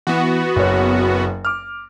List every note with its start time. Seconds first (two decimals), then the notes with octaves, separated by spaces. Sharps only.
0.07 E3 B3 F#4
0.56 F#1 C#5
1.45 D6 F6